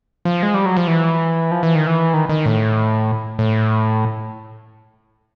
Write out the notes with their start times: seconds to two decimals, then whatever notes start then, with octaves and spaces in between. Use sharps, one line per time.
0.25 F3
0.43 G#3
0.54 G3
0.66 F#3
0.77 F3
0.88 E3
1.51 F3
1.63 E3
1.75 D#3
1.87 E3
2.14 D#3
2.29 D#3
2.46 A2
3.39 A2